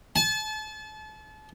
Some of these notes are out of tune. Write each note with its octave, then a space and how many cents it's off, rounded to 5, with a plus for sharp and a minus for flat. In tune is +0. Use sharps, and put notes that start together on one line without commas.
A5 -35